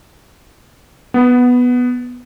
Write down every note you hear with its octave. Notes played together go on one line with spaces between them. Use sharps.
B3